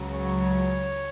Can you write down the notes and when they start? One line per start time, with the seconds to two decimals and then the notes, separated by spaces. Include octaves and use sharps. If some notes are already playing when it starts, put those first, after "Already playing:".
Already playing: C#2 C#3 F#3
0.13 C#5